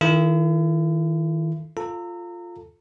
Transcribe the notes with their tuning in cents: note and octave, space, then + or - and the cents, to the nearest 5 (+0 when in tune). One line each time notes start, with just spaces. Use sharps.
D#3 +30 E4 +45 A4 -10
F4 +0 A4 +0 A#5 -30